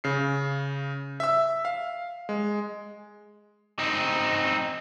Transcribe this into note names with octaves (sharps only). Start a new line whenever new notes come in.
C#3 C7
E5 E6
F5
G#3
C4 D#4